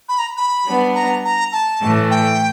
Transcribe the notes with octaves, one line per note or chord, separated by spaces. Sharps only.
B5
A#5
B5
G3 B3 D4
A#5
A#5
A5
A2 E3 A3
G5